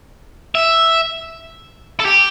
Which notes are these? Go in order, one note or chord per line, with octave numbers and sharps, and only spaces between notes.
E5
A4
G4